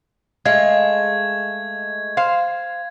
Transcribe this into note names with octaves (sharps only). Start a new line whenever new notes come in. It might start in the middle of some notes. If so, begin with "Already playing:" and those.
G#3 A3 F5 G#6
C5 F5